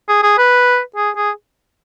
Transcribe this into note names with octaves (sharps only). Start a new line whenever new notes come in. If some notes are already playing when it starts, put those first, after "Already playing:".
G#4
G#4
B4
G#4
G#4